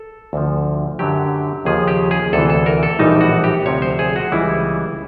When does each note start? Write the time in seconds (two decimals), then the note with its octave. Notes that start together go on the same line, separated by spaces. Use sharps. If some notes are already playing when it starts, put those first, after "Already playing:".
Already playing: A4
0.33 D2 D3 F3
0.99 F#2 D3 F#3 G4
1.65 D#2 C#3 F3 G#4
1.88 G4
2.11 G#4
2.33 D2 C3 E3 A4
2.50 A4
2.66 A#4
2.83 A4
2.99 A#1 A2 E3 G3 D#4
3.21 F#4
3.44 G4
3.66 D2 C3 F3 C#5
3.82 C5
3.99 G#4
4.16 F#4
4.32 C#2 C#3 E3 G3 E4